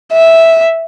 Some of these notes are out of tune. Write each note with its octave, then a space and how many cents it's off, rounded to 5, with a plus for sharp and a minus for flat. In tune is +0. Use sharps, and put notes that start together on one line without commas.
E5 -5